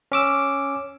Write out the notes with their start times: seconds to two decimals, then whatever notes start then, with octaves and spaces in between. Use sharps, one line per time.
0.12 C#4 D6 E6